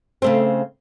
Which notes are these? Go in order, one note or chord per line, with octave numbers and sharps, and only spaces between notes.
C#3 A3 C4